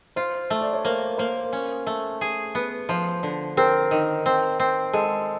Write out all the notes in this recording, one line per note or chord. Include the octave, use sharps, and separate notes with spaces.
F4 C5
A3
D5
C#5
A#3 C5
A#3 C5
C#4
A3
G#4
B3
F3 C5
D3
C4 A#4
D#3
C4
C4
G#3 A4